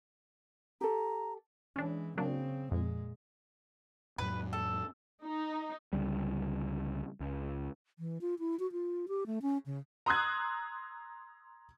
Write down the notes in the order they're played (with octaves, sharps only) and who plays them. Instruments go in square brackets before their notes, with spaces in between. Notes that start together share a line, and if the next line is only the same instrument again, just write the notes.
[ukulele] G4 A4 [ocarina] A#5
[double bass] E3 G#3 [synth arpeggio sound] C#4 D4
[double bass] C#3 C4 [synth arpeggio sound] F#3 A#3 D4
[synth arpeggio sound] F2 [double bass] A#2 G#3
[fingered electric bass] F2 A2 F#3 [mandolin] B4
[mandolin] A4
[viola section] D#4
[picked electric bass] C#2 D3 G3
C#2
[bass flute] E3
F4
E4
F#4
F4
G4
A3
C#4
C#3
[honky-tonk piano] A#5 C6 D#6 E6 F#6 G#6